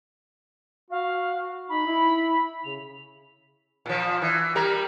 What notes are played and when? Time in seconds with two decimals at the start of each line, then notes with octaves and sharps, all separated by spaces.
0.90 F#4 F5
1.69 D#4 B5
1.87 E4
2.64 C#3 F7
3.86 A#2 F3
4.22 E3
4.56 G3 A#4